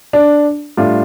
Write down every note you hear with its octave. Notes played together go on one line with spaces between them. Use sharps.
D4
A2 G3 D4 F4